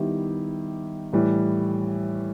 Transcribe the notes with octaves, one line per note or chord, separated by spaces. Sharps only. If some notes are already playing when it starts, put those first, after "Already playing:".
Already playing: D#3 G3 B3 E4 G4
A2 E3 G3